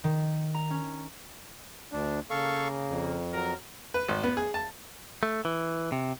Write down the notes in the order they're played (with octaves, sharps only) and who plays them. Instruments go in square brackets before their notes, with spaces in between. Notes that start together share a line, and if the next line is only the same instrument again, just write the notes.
[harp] D#3
A#5
C#4
[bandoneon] D2 D4
[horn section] C#3 A#3 [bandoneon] A4 F5 C#6
[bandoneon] F2
[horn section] F#3 A#4
[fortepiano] B4
G#1
B3
G#4
A5
[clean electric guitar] A3
E3
C3